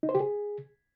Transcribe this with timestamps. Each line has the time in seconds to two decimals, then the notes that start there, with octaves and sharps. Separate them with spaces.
0.03 D#4
0.09 C5
0.15 G4
0.20 G#4